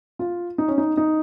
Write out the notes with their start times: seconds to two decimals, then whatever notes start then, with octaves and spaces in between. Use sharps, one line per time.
0.19 F4
0.58 D#4
0.68 C#4
0.78 D#4
0.97 D#4